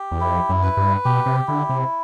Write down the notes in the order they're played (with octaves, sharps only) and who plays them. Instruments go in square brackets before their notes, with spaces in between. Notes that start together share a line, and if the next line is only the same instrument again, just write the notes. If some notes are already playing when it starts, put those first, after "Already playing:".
Already playing: [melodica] G4
[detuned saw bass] E2
[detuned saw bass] F2 [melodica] E4
[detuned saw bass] F#2
[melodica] B4
[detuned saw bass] G2
[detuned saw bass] B2 [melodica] G4
[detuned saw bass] C3
[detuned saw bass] D3 [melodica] E4
[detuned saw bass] C3